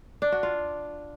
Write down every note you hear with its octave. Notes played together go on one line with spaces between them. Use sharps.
D4
F#4
F4